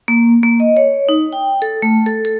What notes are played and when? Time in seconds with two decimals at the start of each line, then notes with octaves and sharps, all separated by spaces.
0.08 A#3
0.43 A#3
0.60 D#5
0.77 C#5
1.09 D#4
1.33 G5
1.62 A4
1.82 A3
2.06 A4
2.25 A4